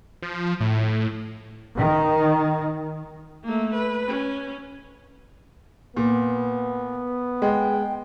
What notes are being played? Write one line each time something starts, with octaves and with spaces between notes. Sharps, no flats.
F3
A2
D#3
A3 A#3
B4
C#4
A#2 B3
G#3 G5